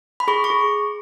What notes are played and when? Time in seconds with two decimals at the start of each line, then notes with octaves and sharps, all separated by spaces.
0.20 B5
0.28 G#4 C#6
0.44 C#6
0.50 G#4